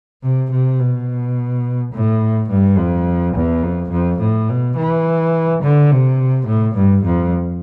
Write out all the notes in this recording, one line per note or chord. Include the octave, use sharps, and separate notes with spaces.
C3
C3
B2
A2
G2
F2
E2
F2
F2
A2
B2
E3
D3
C3
A2
G2
F2